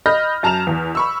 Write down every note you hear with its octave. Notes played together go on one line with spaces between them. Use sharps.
D#5 B5 F6 G6 A#6
F#2 A5 A#5 F6 E7 F7
E2
B5 C#6 E6